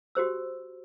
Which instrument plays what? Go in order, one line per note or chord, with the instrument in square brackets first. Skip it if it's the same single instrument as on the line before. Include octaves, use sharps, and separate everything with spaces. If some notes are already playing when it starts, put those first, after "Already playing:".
[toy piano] F#4 G4 C5 E6